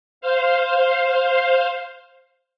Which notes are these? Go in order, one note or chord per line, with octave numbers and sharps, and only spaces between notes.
C5 F5